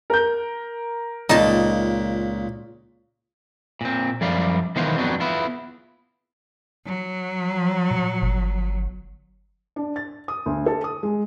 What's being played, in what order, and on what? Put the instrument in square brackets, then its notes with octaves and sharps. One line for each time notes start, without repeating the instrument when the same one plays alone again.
[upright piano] A#4 G6
[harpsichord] C#2 A#2 G5 [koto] D#4 A5
[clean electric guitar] A#2 C4
F#2 F3 G3 D5 F5
D#3 E3 B3 B4 C5 F5
F2 F#3 G3 B3 D4
B3 E4 F4
[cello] F#3
[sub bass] A#2
G1
[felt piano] D4
A6
D#6
D2
A4
D#6
G#3